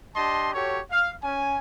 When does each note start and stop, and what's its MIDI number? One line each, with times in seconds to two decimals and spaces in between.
0.16 0.52 62
0.16 0.52 67
0.16 0.52 75
0.16 0.52 81
0.16 0.52 84
0.54 0.79 66
0.54 0.79 67
0.54 0.79 69
0.54 0.79 73
0.90 1.12 77
1.23 1.59 61
1.23 1.59 80